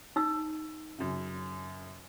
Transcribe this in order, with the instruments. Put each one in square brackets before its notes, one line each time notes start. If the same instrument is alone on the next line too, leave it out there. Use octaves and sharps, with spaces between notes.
[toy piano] D#4 E6
[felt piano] F#2 C#3